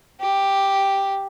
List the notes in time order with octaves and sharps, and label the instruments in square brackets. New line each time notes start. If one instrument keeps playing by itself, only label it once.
[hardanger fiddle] G4